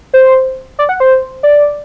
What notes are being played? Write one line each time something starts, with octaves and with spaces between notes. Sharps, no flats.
C5
D5
F#5
C5
D5